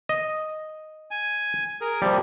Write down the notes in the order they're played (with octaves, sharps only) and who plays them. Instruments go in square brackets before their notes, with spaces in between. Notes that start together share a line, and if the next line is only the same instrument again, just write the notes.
[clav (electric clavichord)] D#5
[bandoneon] G#5
G#4 A#4
[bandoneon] C3 F3 A#3 [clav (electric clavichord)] G3